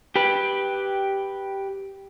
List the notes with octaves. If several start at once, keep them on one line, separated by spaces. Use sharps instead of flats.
G4 B4